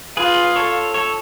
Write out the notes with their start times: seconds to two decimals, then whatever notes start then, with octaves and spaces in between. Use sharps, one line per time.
0.17 F4 G#4 B4
0.56 A4 C#5
0.94 A4 C#5